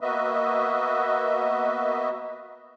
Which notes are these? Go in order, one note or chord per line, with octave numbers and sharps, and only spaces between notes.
A#3 B3 F#4 B4 D#5 E5